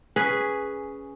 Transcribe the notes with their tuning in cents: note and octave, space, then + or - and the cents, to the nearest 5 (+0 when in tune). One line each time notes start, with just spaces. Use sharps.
C#4 +5 G#4 +0 B4 +0